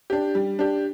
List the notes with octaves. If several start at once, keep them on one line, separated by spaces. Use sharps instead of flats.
D4 G4
G3
D4 G4